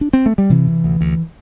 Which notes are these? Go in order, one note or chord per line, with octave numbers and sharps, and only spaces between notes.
D4
C4
A3
G3
C3 E3
C3
D2
D2